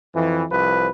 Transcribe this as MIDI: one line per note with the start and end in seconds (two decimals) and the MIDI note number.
0.14 0.43 41
0.14 0.43 52
0.50 0.87 36
0.50 0.87 53
0.50 0.87 71